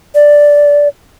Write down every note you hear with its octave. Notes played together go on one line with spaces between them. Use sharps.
D5